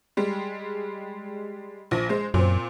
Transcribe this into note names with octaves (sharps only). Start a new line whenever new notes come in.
G3 G#3
A#1 F3 A#6
G#3 C5
F#2 A#2 C4